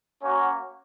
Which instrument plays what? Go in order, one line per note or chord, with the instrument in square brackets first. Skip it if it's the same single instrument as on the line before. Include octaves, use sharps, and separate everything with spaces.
[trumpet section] A#3 C#4 F#4 C#5